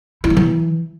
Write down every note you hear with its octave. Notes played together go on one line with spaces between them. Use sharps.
E4
B3
E3